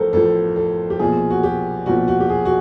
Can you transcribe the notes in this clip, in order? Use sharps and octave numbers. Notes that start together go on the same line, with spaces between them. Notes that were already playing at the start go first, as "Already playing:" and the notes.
Already playing: A1 A2 F3 A4 A#4 C5
A1 A2 F3 A4
A4
G4
B1 A#2 F3 G#4
F#4
G4
B1 A#2 F3 F#4
F#4
G4
G#4
F#4